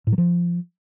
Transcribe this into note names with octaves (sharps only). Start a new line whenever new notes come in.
A2
F#3
F3